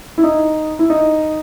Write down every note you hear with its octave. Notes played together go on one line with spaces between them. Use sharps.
E4
D#4
E4
D#4